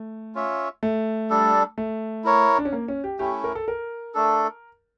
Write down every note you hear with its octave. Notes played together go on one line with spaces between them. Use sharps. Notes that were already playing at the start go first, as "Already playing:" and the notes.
Already playing: A3
C#4 F4 C#5 E5
A3
G3 D4 A4
A3
E4 A#4 C#5
D4
C#4
A#3
C#4
G4
A3 C#4 E4 G4
A#4
A4
A#4
A3 D4 A4